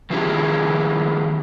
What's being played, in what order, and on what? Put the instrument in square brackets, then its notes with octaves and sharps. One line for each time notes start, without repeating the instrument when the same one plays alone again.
[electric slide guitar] D#3 F3 C#4 E4 G4 G#4